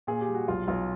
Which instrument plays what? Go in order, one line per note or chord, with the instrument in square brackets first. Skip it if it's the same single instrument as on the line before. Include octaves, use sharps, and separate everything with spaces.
[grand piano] A#2 G#4
G4
G3
F#4
B1 F4
B1 F4